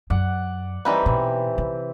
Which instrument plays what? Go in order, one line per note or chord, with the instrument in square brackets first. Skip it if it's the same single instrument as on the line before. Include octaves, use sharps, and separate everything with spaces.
[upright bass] F#2 [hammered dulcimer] D5 F#5
[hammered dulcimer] E3 C4 G4 [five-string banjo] G3 D#4 B4
[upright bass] B2
C3